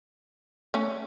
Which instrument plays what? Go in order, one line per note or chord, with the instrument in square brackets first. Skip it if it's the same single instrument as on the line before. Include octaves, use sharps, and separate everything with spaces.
[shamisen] A3 C#4